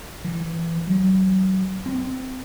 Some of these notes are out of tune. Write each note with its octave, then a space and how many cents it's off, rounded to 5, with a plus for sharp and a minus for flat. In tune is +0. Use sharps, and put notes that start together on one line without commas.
E3 +15
F#3 +35
C4 -20